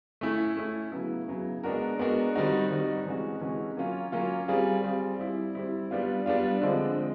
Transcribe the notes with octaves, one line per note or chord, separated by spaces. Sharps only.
A3 C#4 E4
A3 C#4 E4
C#3 F#3 B3 E4
C#3 F#3 B3 E4
G#3 B3 D4 F#4 A#4
G#3 B3 D4 F#4 A#4
D#3 G3 C4 D#4 F#4
D#3 G3 C4 D#4 F#4
C3 E3 G#3 C#4 F#4
C3 E3 G#3 C#4 F#4
F#3 A#3 C#4 F4
F#3 A#3 C#4 F4
G3 C4 F4 G#4
G3 C4 F4 G#4
G3 C4 E4
G3 C4 E4
G3 B3 D4 F4
G3 B3 D4 F4
D3 F3 G#3 C4
G#3 C4